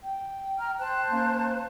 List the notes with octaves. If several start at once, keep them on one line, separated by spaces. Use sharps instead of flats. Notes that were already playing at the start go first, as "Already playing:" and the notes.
G5
A#5 F6
C5 A5 F#6
A#3 C#4